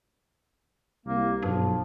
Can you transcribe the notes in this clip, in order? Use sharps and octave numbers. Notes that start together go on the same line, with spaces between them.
C2 A#3
B1 G2 F3